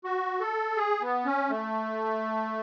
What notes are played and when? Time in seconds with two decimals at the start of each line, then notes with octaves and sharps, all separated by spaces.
0.04 F#4
0.40 A4
0.77 G#4
1.01 B3
1.26 C#4
1.50 A3